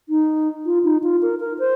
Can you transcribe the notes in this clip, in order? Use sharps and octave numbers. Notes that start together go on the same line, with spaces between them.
D#4
F4
D#4
F4
A#4
A#4
C5